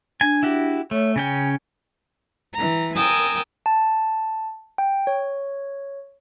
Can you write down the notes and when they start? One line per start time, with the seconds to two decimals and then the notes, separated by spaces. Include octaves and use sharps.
0.21 D4 G#5
0.43 E4 F#4 G4
0.91 A3 C#5
1.16 C#3 C#4 G5 G#5
2.54 E3 A#5
2.95 A#4 G5 G#5 D#6 E6 A6
3.66 A5
4.78 G5
5.07 C#5